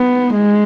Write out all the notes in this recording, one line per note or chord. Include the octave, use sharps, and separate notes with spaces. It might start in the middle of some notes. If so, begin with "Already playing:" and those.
Already playing: B3
G#3